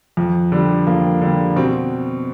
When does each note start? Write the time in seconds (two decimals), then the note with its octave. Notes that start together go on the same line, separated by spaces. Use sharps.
0.17 F2
0.52 D3 G3
0.87 F2 A#3
1.21 D3 G3
1.56 B2 C4